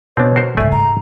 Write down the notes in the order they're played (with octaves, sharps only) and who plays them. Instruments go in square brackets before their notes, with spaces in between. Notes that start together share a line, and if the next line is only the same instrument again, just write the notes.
[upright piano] B2 [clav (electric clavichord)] C4 D4 [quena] C#5
[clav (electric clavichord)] F#4 A#4 C5 [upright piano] C7
[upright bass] C#2 G#2 [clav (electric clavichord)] A3 D5 G#5 [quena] E5
[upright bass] G#2 [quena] A#5